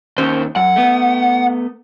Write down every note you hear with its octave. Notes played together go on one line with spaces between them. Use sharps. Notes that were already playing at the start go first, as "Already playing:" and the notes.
D#2 C#4 C5
F#2 F#5
A3 B3